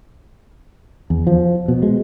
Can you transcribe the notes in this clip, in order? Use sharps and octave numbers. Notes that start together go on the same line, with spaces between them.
E2
F3
B2
G#3